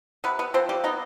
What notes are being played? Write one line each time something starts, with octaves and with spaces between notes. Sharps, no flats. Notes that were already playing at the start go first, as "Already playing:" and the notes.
C3 B3 B4
B3 B4
F3 C4 C5
G3 G4
B3 D#4